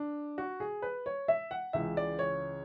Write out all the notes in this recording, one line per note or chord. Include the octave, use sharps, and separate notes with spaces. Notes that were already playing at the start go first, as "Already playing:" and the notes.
Already playing: D4
F#4
G#4
B4
C#5
E5
F#5
C#2 C#3 E3 E5
D5
C#5